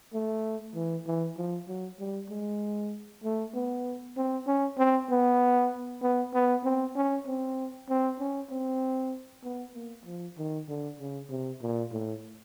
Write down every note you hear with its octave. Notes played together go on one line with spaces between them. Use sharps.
A3
E3
E3
F3
F#3
G3
G#3
A3
B3
C4
C#4
C4
B3
B3
B3
C4
C#4
C4
C4
C#4
C4
B3
A#3
F3
D#3
D3
C#3
C3
A#2
A2